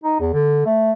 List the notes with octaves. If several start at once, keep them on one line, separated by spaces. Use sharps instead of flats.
D#4
E2
D3
A3